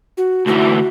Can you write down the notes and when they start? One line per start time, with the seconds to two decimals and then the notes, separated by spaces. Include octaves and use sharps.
0.17 F#4
0.47 D2 E3 F#4